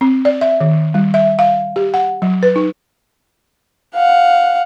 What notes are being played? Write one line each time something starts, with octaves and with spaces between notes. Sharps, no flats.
C4
D5
E5
D#3
G3
E5
F5
G4
F#5
F#3
B4
D#4
F5 F#5